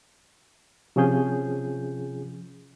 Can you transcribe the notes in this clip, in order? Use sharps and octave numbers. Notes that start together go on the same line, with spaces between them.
C3 F3 C#4 F4 G#4 G6